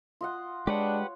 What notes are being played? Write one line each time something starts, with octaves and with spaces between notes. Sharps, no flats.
F4 D#5 F#5
G#3 D4 G4 B4 C#5 F#5